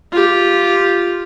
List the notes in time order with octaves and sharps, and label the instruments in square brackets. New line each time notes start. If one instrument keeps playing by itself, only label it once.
[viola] F4 G4